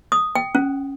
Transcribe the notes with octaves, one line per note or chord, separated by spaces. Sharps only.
D#6
G5
C#4